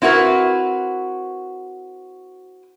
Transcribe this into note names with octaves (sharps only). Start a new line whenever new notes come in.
C4 E4 F#4 G#4 A#4 B4